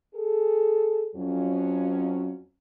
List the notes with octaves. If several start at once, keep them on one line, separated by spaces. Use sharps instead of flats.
G#4 A4
F2 F#3 C#4